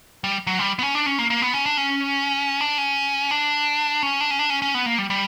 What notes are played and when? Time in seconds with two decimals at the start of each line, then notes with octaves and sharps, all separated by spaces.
0.24 G3
0.47 F#3
0.59 G3
0.79 B3
0.83 C#4
0.95 D4
1.06 C#4
1.19 A#3
1.30 A#3
1.42 B3
1.54 C#4
1.66 D4
1.77 C#4
2.61 D4
2.78 C#4
3.31 D4
4.03 C#4
4.21 D4
4.31 C#4
4.39 D4
4.50 C#4
4.62 C#4
4.75 B3
4.86 A#3
4.98 G3
5.10 G3